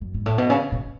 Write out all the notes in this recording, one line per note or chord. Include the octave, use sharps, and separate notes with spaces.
F#2
G#2
A2
B2
C#3
B2